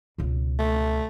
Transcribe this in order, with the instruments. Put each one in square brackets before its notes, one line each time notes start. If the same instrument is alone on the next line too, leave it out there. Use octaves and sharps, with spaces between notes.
[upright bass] C#2 B2
[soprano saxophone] A3